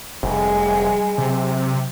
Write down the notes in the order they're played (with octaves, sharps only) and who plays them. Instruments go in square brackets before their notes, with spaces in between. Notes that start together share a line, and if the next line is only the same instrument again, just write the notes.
[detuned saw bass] F1 [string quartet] G3 G#3
[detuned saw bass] C3 [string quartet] F#3